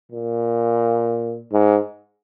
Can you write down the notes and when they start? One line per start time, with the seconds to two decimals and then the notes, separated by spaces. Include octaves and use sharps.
0.12 A#2
1.52 G#2